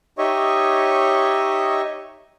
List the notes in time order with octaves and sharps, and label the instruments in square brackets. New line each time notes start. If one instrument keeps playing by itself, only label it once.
[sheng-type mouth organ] D#4 G4 C#5 D#5 E5 C#6